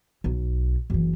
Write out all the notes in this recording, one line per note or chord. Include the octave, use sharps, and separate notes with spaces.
B1
F#1 E3